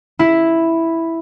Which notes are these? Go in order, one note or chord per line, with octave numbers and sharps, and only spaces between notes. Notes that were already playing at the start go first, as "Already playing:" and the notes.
E4